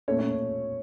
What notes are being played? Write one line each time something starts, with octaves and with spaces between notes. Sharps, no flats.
A#2 A3 C#4 C#5
C#4 C#5